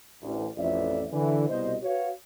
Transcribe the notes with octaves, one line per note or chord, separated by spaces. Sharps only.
A1 D2
A1 F2 D5 E5
D3 E3
C2 B2 C5 D#5
F#4 B4 C#5 F5